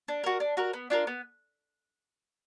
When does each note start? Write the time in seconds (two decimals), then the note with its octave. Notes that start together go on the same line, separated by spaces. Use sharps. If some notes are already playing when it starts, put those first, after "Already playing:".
0.08 D4
0.24 F#4 A#4
0.40 D4
0.57 F#4 A#4
0.73 B3
0.90 D4 F4 A#4
1.07 B3